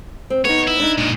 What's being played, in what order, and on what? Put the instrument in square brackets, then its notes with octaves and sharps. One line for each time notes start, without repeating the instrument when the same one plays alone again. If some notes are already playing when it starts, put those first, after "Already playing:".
[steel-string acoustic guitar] C4
[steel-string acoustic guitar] B3 D#4 [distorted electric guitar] C#5
[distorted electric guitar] E4
[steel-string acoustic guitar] D4 D#4
[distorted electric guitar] A#2 G#3